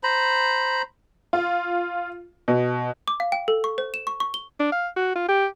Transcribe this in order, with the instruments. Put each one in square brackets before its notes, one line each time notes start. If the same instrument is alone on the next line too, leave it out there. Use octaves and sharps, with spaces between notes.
[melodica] C5 A#5 B5
[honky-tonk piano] F4
B2
[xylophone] D6
F5
G5
A4
C#6
C5
E7
C#6
C#6
G7
[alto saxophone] D4
F5
F#4
F4
G4